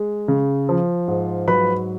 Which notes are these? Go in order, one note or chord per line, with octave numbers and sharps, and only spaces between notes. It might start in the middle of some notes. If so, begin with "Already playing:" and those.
Already playing: G#3
C#3
F3
G#2
F#3 B4 B5